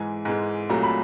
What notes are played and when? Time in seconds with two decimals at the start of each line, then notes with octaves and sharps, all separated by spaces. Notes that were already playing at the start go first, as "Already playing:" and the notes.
Already playing: G#2 E3 G#3 G#5
0.25 G#2 E3 G#3
0.69 C2 A#2 F#3 A3 A#5
0.83 B5